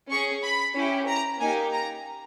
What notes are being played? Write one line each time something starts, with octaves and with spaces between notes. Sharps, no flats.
C#4 G#4 C#6
B5
C#4 E4 G4
A#5
A#3 D#4 G4 G#5
A#5